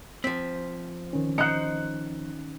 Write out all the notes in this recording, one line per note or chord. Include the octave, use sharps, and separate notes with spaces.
F3 C4 B6
D#3 C#4
D#4 C5 F#6 C#7